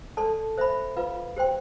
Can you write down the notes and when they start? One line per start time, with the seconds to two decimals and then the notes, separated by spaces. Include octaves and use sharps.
0.17 A4 D5 A5 C6
0.58 C5 E5 B5
0.97 F4 B4 F5
1.36 G4 C5 G5 C6